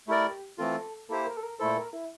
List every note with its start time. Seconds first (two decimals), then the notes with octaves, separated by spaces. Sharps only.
0.08 A3 E4 G4 A#4 D5
0.58 E3 A3 C4 F4 A4
1.09 A#3 E4 G4 A4 C5
1.26 A#4
1.37 A4
1.43 A#4
1.59 A#2 A3 E4 A4 C5
1.77 A#4
1.93 E4